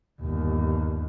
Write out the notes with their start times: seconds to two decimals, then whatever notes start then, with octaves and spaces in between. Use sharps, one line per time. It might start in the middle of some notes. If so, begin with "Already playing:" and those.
0.22 G1 D#2